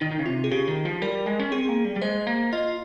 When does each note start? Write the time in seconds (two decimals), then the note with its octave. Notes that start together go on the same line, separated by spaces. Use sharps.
0.01 D#3 D#4
0.11 D#3
0.19 C#3
0.26 C3 F4
0.44 G#4
0.51 C#3 G4
0.68 D#3
0.85 F3
1.02 G3 A#4
1.26 G#3
1.39 C#4
1.52 C4 G#4
1.69 A#3
1.85 G3
1.96 G3
2.02 G#3 C5
2.27 A#3
2.53 F4 D#5